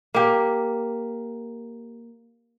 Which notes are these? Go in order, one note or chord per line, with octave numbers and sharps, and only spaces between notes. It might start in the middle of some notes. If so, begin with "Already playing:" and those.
A#3 G4